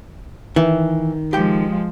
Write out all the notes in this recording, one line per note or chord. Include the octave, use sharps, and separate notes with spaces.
D#3 E3
F3 G#3 G4 G5